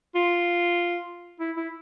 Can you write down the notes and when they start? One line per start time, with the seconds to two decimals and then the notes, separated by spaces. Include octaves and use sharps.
0.15 F4
1.40 E4
1.57 E4